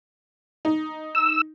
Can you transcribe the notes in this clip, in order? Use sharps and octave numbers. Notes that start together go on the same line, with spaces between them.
D#4
E6